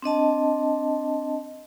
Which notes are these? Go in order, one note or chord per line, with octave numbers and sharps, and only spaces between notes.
C4 D4 D#5 A5